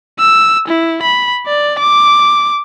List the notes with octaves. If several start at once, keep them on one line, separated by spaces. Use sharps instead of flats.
E6
E4
B5
D5
D6